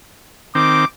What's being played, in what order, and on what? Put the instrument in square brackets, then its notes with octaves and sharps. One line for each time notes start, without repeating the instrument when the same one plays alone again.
[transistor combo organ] D#3 C4 [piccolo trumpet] D6